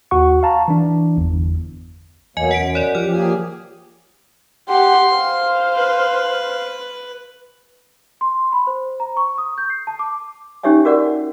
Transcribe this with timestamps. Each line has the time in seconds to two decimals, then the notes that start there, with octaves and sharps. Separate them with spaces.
0.11 D#2 F#4 F#5 C#6
0.43 F5 A5 A#5
0.68 E3 D4
1.17 G1 E2
2.37 E2 B2 F#3 A#3 D#5 G#5
2.51 F#2 F#5 B6 D7
2.75 C#5 D5
2.95 F3 G4 F6
3.13 A#3 G#4 G#5
4.68 G4 F#5 C6
5.14 C5 F5
5.76 B4
8.21 C6
8.52 B5
8.67 C5
9.00 A#5
9.17 C#6
9.38 D#6
9.58 G6
9.70 C7
9.87 A5
9.99 D6
10.63 C#4 D#4 G4 C#5 E5 G#5
10.85 F#4 A#4 D5 F#5